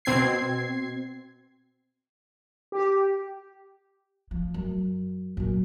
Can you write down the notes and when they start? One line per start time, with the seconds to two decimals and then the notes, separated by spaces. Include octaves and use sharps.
0.05 B2 C4 G#6 C7
2.72 G4
4.31 F3
4.54 F#2
5.37 F#2 A#2